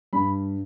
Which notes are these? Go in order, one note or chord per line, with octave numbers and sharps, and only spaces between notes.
G2 B5